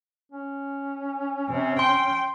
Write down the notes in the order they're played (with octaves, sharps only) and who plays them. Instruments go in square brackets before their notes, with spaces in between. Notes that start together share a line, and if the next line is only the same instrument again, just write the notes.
[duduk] C#4
[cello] C3
[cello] G5 [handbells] C6